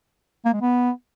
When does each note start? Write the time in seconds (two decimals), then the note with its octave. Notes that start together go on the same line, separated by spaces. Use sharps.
0.45 A#3
0.54 G#3
0.62 B3